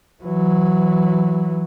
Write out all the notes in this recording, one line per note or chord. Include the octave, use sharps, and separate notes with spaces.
E3 F#3